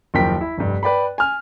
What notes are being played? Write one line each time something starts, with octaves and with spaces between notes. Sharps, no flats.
F#1 D#2 F3 A#4 G5 B6
E4
F1 G2
B4 D5 G5 B5
G#5 F6